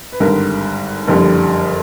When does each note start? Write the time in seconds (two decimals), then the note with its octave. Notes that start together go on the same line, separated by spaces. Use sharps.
0.12 B4
0.20 G#1 G2 D3 A#4
1.08 F#1 F2 D3 G3